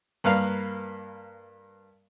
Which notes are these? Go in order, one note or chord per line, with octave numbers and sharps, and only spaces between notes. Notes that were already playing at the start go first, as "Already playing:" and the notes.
G2 A#3 B4 F5 A#5